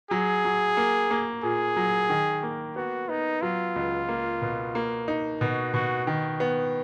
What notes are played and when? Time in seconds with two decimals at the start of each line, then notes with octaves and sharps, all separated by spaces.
0.10 F#3 G#4
0.45 F#3
0.77 A#3
1.11 A#3
1.43 A#2 G#4
1.76 F#3
2.09 D#3
2.43 A#3
2.76 B3 F#4
3.09 B3 D#4
3.42 F#3 F4
3.76 C#2
4.08 A#3
4.42 B2
4.75 A#3
5.08 D#4
5.41 B2 F#4
5.74 B2 F#4
6.07 D#3
6.40 B3